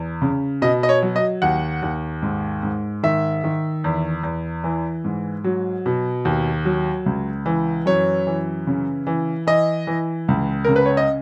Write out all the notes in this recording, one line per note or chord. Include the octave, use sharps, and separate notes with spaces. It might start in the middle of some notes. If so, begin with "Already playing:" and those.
Already playing: E2
C#3
B2 D#5
D#5
C#5
F#3
D#5
D#2 F#5
D#2
G#2
G#2
D#3 E5
D#3
E2
E2
E3
G#2
F#3
B2
D#2
F#3
C#2
E3
F#2 C#5
E3
C#3
E3
E3 D#5
E3
C#2
C#3 A#4
B4
C#5
D#5